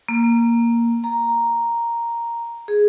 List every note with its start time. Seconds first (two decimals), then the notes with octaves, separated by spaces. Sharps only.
0.09 A#3
1.04 A#5
2.68 G#4